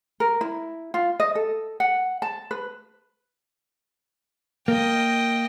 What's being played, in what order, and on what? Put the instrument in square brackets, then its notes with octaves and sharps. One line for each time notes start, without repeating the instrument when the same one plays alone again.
[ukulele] A#4
E4
F4
D#5
A4
F#5
A5
B4
[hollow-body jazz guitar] A#3 [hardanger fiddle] D#5 G5